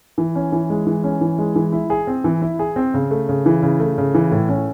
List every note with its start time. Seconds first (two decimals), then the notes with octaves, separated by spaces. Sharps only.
0.18 E3
0.35 C#4
0.52 E3
0.70 G#3
0.86 E3
1.04 C#4
1.21 E3
1.38 G#3
1.56 E3
1.72 E4
1.90 G#4
2.07 C4
2.24 E3
2.42 E4
2.59 G#4
2.76 C4
2.94 C#3
3.11 A3
3.29 C#3
3.46 E3
3.63 C#3
3.80 A3
3.98 C#3
4.14 E3
4.31 A2
4.49 C#4